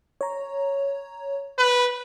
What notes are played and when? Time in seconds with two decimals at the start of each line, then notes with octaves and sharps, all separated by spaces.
0.21 C#5 A#5
1.58 B4